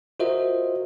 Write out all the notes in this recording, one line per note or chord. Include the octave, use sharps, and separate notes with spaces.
F4 F#4 A#4 C5 D#5 E5